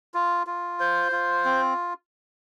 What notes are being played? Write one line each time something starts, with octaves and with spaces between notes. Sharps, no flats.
F4
F4
C5
F4
C4